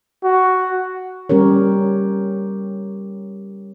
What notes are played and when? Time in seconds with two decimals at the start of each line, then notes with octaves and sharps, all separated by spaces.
0.24 F#4
1.29 G3 C#4 G4 A#4 C#5